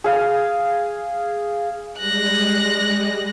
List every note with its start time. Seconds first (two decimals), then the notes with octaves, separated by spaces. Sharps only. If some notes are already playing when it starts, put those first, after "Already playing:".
0.04 G#4 F5
1.98 G3 G#3 F#6 A#6